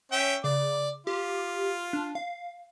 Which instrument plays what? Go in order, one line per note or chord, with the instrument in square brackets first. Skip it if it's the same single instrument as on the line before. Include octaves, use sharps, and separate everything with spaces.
[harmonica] C#4 E5 G5
[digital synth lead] C#3 [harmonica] D5
[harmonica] F4 [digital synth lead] G4
[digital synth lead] D4
F5